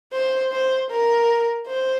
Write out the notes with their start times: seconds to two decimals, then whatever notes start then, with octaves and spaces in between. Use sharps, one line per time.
0.13 C5
0.52 C5
0.91 A#4
1.68 C5